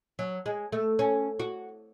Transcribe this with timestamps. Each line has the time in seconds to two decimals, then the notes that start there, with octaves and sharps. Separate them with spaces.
0.19 F#3
0.46 G#3
0.72 A3
0.99 C#4
1.39 F#4